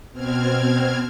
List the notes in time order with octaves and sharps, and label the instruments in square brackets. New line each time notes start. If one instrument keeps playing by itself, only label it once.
[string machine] B2 C4 F6 G#6